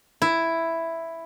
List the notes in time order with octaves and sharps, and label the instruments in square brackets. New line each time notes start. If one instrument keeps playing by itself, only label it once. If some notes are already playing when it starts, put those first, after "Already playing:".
[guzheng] E4